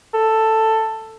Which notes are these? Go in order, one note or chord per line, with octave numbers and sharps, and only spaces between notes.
A4